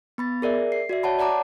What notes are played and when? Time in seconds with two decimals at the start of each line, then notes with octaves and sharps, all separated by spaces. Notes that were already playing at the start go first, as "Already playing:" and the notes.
0.18 B3 B5 A6
0.42 G#4 A#4 D5 E5
0.72 C7
0.89 F#4 D5 E5
1.03 C#5 F#5 A5 B5
1.19 D5 F#5 A5 A#5 D6